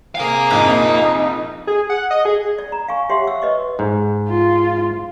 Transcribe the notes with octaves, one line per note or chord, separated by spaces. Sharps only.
C3 G#4 A#4 F5 D#6
A#1 F2 D#4
G#4
F#5
D#5
G#4
D5
A#5
F5 G#5 C#6
G4 C#5 E5 F#5 C6
C#6 E6
B4 D#5 C#6
G#2
F4